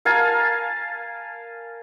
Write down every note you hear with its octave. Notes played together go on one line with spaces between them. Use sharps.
A#4 F5 G#5 A5